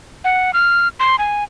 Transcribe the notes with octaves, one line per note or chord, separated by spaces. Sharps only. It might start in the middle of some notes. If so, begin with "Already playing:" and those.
F#5
F6
C6
G#5